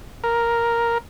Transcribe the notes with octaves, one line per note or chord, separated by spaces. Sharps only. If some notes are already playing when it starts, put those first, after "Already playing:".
A#4